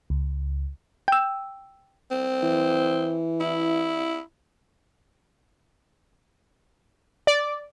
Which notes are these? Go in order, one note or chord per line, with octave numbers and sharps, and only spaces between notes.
C#2
G5 E6
C4
E3
E4
D5